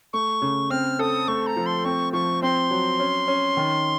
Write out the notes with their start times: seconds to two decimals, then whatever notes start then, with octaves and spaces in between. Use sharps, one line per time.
0.13 A3 C#6
0.42 C#3
0.70 C4 F6
0.99 A4 D#6
1.28 A3 C#6
1.47 A#5
1.56 F3
1.66 C6
1.85 C4 C#6
2.13 F3 C#6
2.42 C4 C6
2.71 F#3
2.99 C#4
3.28 C#4
3.57 D#3